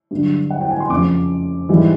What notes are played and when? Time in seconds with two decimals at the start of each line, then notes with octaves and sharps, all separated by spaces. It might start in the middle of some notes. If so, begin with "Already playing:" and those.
0.11 G2 D3 F#3
0.50 F#5
0.61 G5
0.71 G#5
0.80 C6
0.90 F2 C#3 F3 D6
1.69 G#2 E3 G3